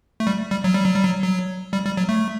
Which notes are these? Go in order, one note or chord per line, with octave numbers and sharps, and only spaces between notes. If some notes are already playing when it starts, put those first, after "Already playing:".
A3
G3
G3
F#3
G3
F#3
G3
F#3
F#3
G3
G3
F#3
A3